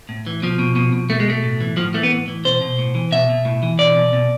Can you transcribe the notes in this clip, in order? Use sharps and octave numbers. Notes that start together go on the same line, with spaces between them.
A2
E3
B2 F3
B2
B2
B2
B2 A3
G#3
B2 A3
A2
E3
A2 F3
E3 A3
B3
A2
E3
B2 C5
B2
A2
E3
B2 E5
B2
A2
E3
B2 D5
B2
B2